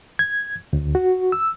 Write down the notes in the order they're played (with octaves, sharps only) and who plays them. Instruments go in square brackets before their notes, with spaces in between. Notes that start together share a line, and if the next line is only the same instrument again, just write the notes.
[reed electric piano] G#6
D2
F#4
E6